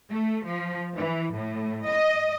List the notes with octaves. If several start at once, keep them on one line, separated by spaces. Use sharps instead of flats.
A3
F3
E3
A2
D#5